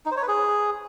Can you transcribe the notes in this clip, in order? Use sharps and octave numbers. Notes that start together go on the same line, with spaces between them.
D#4
C5
C#5
B4
G#4